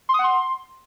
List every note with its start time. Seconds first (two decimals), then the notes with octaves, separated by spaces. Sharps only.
0.09 C6
0.14 D#6
0.19 F#5
0.24 C6